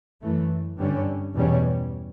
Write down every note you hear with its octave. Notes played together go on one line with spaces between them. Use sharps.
F#2 E3 A3
G2 D3 G3 C#4
E2 B2 G3 C#4